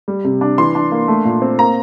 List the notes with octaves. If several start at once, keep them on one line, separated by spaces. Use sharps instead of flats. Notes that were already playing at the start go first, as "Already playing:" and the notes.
G3
C3
D4
E3 C6
D4
A#3
A3
A#2
C4
A#3 A#5